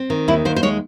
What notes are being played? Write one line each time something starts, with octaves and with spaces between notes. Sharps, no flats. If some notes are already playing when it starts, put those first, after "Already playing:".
Already playing: C4
D#3
D#2 E4
D#2 C5
C5
G#3 C#5